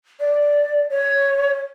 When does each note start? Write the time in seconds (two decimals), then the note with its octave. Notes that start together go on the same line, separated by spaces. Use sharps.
0.19 D5
0.90 C#5